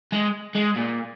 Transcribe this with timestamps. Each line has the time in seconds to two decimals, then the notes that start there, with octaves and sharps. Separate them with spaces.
0.12 G#3
0.55 G#3
0.76 A#2